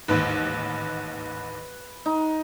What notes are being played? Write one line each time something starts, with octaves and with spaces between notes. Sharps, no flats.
A1 D#2 G#2 B4
D#4